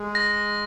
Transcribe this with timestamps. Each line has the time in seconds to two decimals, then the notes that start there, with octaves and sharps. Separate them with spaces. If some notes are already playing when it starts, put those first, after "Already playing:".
Already playing: G#3
0.15 A#6